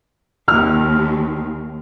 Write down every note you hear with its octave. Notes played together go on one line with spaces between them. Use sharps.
D#2 F6